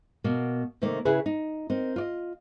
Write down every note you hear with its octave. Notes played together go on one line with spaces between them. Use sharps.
B2 A#3
C3 D#3 A3 A#3
C#3 E4 G#4 B4
D#4
C4 D#4 A#4
F4 D5 D#5